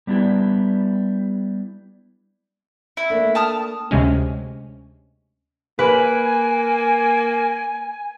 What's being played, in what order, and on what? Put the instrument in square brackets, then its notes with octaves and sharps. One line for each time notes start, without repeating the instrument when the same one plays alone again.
[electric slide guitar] G3 B3 D4 E4 G4
[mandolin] E4
[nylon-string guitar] A3 A#3 D4
[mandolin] A5 D#6 F6
[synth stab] D2 C3 G#3 C#4
[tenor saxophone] A#3 [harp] B4 [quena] G#5